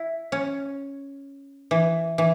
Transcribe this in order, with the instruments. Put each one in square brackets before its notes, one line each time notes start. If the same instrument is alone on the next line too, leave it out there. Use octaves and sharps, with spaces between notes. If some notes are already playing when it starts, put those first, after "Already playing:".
Already playing: [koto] E4
C#4
E3
E3